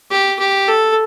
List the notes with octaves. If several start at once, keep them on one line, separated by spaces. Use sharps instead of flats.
G4
G4
A4